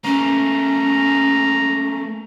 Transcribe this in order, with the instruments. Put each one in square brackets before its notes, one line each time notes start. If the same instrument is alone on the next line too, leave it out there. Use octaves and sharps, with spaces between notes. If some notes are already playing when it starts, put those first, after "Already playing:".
[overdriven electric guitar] A3 A#3 [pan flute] C#4 [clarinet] A#5